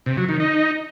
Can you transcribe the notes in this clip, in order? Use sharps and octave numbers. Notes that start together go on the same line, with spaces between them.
C3
F#3
D#3
D#4